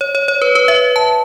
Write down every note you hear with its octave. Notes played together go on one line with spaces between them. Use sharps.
C#5
C#5
C#5
B4
B4
E5
A5